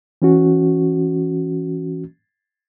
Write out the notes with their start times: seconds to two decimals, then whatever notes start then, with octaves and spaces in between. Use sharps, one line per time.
0.22 E3 C#4 F#4